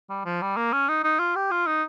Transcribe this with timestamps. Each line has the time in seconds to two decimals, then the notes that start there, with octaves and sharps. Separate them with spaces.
0.10 G3
0.25 F3
0.42 G3
0.57 A#3
0.73 C#4
0.88 D#4
1.04 D#4
1.19 F4
1.35 G4
1.51 F4
1.67 D#4